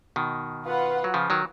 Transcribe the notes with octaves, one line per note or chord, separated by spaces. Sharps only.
B2 D#3
F4 B4 F#5
F#3
C#3 F3
D#3 F#3